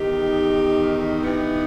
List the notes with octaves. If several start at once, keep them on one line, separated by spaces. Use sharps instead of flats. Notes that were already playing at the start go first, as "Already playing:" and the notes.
Already playing: E2 D#3 D#4 G4
G2 E3 B3 D#4